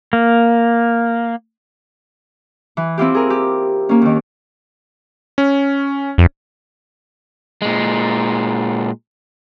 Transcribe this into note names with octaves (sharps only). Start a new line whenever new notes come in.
A#3
E3
C4 E4 F4 G4
G#4 A#4
G4
A#3 C#4
D#2 D#3
C#4
F2
A#2 G#3